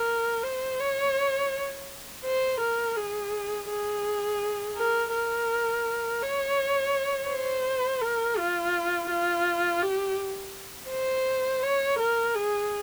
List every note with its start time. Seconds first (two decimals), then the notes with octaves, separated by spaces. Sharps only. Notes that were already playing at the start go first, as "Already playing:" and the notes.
Already playing: A#4
0.44 C5
0.80 C#5
2.24 C5
2.60 A#4
2.96 G#4
3.69 G#4
4.77 A#4
5.13 A#4
6.22 C#5
7.29 C5
8.02 A#4
8.38 F4
9.10 F4
9.82 G4
10.90 C5
11.62 C#5
11.99 A#4
12.34 G#4